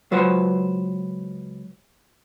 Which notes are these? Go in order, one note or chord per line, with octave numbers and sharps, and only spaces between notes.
C#2 F#3 F4 B4 C5 F#5